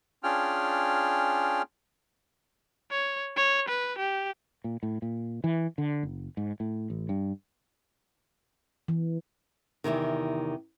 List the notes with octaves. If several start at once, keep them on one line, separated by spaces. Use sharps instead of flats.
C#4 D4 F4 G#4 G5 F6
C#5
C#5
B4
G4
A#2
A2
A#2
E3
D3
F#1
G#2
A2
A1
G2
E3
E2 G2 C3 D#3